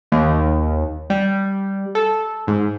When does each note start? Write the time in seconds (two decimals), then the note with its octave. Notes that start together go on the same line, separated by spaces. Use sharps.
0.12 D#2
1.10 G3
1.95 A4
2.47 G#2